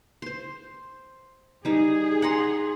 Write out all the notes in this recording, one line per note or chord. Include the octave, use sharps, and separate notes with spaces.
C5 C6
G3 D#4 G#4
F#5 A#5 C6